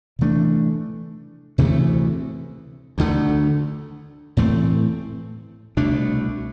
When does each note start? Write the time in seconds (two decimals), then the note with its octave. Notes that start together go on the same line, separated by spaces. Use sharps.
0.19 C3 E3 A3 D4
1.58 D2 C3 E3 A3
2.98 D2 D3 A3
4.37 A2 E3 A3 C4
5.77 C2 B2 A3 D4